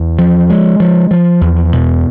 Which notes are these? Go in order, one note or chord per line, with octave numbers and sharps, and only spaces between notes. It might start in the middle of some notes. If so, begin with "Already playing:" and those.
Already playing: E2
F3
G#3
F3
F3
E2
B2